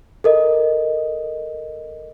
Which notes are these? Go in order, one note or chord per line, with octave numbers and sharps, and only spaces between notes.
A4 A#4 D#5